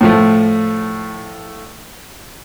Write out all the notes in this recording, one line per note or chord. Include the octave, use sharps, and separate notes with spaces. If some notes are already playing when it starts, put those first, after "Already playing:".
A2 F3 A3